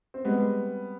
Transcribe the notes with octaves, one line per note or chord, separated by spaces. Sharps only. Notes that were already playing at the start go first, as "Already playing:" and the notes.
C4
G3 G#3 B3